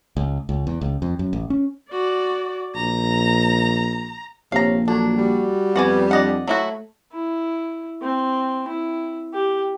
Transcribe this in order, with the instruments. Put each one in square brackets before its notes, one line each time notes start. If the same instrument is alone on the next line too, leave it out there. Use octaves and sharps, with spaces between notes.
[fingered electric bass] C#2
C#2
E2
C#2
F2
F#2
A1
C#4
[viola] F#4 D5
[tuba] A#1 [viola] A#5
[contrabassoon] A#1 [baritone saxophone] C3 [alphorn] C#5 [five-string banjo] F5 A#5
[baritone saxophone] F#3 [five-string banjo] D4 [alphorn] A4
[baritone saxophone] G3 [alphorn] F#4
[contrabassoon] F2 [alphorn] B3 [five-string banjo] F#4 D5 G#5
[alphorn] D4 [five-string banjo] D5 D#5 F#5
[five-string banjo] F#3 E4 F#4 [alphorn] A3
[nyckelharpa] E4
C4
E4
G4